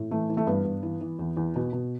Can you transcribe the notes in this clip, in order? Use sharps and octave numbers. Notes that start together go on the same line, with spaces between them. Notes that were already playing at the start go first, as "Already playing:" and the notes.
Already playing: A2
E3 A3
E3
A3
G2 B3
G2
E3
E3
E2
E2
B2
B2